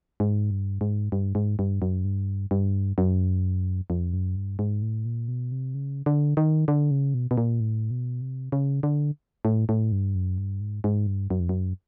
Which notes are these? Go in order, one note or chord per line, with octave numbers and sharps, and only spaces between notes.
G#2
G2
G#2
G2
G#2
G2
F#2
G2
G2
F#2
F2
F#2
G2
G#2
A2
A#2
B2
C3
C#3
D3
D#3
D3
C#3
B2
B2
A#2
A2
B2
C3
C#3
D3
A2
A2
G2
F#2
G2
G#2
G#2
G2
F#2
F2
F#2